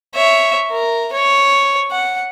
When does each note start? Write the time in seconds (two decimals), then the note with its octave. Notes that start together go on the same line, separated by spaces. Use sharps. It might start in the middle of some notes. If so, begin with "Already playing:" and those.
0.14 C#5 E5
0.71 A#4
1.12 C#5
1.91 F#5